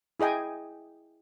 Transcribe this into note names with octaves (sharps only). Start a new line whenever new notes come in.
E4 G#4 D#5 G5 G#5